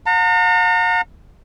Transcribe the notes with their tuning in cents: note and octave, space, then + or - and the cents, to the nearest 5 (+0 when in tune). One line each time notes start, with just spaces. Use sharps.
F#5 -45 A#5 -40